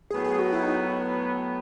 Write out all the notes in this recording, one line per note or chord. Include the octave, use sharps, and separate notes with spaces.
A2 F#3 B3 G#4
G#4
F#4
E4
D#4